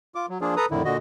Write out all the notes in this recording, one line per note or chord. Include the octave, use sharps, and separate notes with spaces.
F4 D6
F#3
F3 A#3 D4 F4 G#4
A4 B4 A#5 D#6
F2 A2 D3 D#3 E4
A#2 D3 F#4 D#5